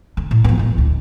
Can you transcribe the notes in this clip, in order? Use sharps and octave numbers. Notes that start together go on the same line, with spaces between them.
D3
A2
F3 B3
A2 G#3
D2